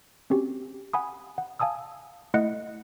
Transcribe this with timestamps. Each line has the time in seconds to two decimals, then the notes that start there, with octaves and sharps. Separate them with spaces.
0.30 C4 C#4 F#4 G4
0.93 F#5 G#5 B5 D#6
1.38 F#5
1.60 F5 G#5 A5 D#6 E6
2.34 A3 E4 D#5 F#5 F#6 C#7